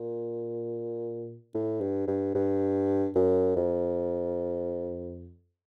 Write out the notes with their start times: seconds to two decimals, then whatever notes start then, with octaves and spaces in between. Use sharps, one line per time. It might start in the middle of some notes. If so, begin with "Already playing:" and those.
Already playing: A#2
1.55 A2
1.81 G2
2.08 G2
2.35 G2
3.16 F#2
3.56 F2